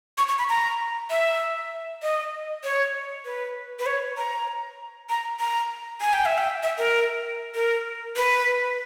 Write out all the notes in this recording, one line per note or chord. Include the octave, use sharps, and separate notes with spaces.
C#6
C#6
B5
A#5
E5
D#5
C#5
B4
B4
C#5
A#5
A#5
A#5
G#5
G5
E5
G5
E5
A#4
A#4
B4